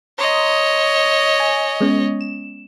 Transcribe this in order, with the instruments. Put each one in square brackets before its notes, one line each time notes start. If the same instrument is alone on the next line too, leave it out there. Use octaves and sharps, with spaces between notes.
[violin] C#5 D#5 [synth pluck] A#5 C6 D#6
[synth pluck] G#5
G#3 B3 C#4
E7